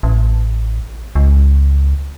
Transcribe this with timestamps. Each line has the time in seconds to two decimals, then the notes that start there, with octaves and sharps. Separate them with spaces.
0.03 A1
1.15 C#2